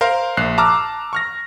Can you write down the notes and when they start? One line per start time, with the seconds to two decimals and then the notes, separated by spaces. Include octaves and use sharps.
0.01 A#4 C5 F5 C6
0.37 A#1 F#6 C7
0.58 A5 A#5 D6 E6 F6
1.13 C#6 F6 A#6